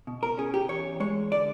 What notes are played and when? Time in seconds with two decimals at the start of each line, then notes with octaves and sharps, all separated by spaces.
0.07 B2
0.23 A#4
0.37 C#4 G#4
0.54 G4
0.69 E2 C#5
1.00 G#3 C#5
1.31 D3 D5